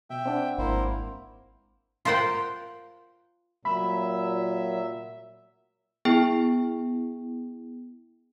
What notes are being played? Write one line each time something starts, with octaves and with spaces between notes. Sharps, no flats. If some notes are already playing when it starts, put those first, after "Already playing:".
B2 E5 G5
C4 D4 F#5
G#1 G#2 A#3 E4 C5
F4 A#4 C5 F#5 G5
A#2 F#3 E5 B5
B3 E4 G#4 G5